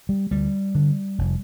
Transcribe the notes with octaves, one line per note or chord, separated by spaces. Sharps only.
G3
D2 G3
D3
F1